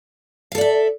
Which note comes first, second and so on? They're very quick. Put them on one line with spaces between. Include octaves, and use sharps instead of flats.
F5 A4 D5 E5